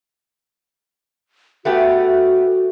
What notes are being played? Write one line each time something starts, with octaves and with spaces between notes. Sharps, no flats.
A3 B3 F#4 G4